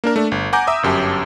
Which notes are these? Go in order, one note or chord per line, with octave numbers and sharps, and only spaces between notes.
A#3 D4 A#4
A3 D4
G1
F#5 G#5 A#5 D6 G6
E5 A#5 D#6 E6
G1 F#2 G4 A5